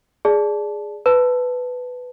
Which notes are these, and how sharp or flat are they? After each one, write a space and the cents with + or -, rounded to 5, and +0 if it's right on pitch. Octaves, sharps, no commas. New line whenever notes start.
G#4 +0 D5 +0 A5 -15
B4 +10 A5 +0